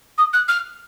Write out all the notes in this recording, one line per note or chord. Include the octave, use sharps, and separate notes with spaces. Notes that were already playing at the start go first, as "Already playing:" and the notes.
D#6
F#6
F6